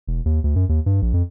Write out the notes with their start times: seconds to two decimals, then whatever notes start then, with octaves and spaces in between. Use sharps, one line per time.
0.07 E1
0.25 D#2
0.44 D2
0.56 F#2
0.69 D#2
0.86 G2
1.02 A#1
1.14 F2